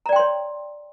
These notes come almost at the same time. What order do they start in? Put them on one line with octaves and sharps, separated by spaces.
A#5 D5 G5 C6 C#5